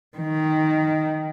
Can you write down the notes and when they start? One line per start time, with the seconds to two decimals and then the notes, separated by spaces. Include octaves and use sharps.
0.17 D#3